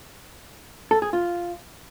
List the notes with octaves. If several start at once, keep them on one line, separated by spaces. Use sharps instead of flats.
A4
G#4
F4